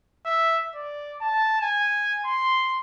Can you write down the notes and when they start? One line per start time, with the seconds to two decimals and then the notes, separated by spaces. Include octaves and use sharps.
0.25 E5
0.75 D5
1.21 A5
1.61 G#5
2.25 C6